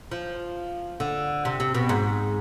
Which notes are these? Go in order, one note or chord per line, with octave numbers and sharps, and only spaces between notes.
F3
D3
C3
C3
B2
G#2